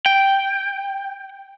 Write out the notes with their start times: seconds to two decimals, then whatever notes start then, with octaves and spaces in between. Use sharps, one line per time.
0.06 G5